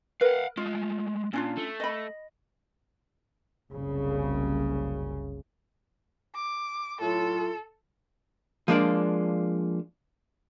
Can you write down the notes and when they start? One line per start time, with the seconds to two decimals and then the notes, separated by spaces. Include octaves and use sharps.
0.21 A#4 B4 F5 F#5
0.57 G#3 A3 F4
1.33 A#2 C#4 D4 F4
1.58 A3
1.80 D#5 B5
3.72 F#1 C2 C#3
6.35 D6
7.01 A2 F#3 F4 A4
8.68 F3 G#3 A#3 D4 D5